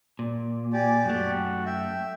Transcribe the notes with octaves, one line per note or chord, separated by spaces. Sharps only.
A#2
G4 D5 G#5
F#2 A3 F#4
E5 G5